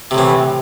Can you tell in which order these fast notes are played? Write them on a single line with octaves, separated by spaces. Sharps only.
C3 A2 E3